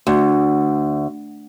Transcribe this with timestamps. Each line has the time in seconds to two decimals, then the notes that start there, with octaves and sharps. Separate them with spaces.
0.07 D2